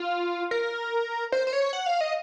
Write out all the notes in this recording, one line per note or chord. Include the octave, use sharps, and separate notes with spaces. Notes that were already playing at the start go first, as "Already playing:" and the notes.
Already playing: F4
A#4
C5
C5
C#5
F#5
F5
D#5